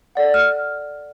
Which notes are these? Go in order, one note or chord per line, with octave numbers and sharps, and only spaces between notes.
A4 D5 F#5
F6